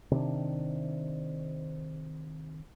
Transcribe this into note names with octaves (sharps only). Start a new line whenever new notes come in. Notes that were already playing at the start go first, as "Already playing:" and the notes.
C3 D#3 C4 D4